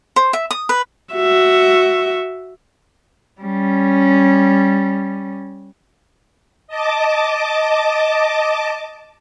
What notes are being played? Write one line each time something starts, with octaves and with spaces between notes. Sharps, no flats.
C5
E5
D#6
B4
F#4 E5
G3 C#4
D#5 A5 D6